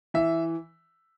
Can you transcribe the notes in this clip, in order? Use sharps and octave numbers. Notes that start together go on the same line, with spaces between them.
E3 E5